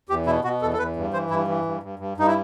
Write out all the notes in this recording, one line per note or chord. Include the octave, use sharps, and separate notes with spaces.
E2 G4
B2 E4
B2 F#4
E2 A4
A4
E2 B4
G2
E3 C5
G2 E4
E3
G2
G2
G2
G2 D#4
E4